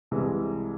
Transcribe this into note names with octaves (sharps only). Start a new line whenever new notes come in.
C2 C3 E3 G#3